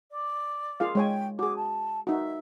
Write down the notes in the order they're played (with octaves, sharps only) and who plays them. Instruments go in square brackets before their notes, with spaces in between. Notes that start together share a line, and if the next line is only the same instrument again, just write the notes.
[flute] D5
[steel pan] F4 G#4 F5
[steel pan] G#3 C#5 G#5 [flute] G5
[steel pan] F#4 G#4 [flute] D6
[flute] A5
[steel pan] D#4 F#4 [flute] E5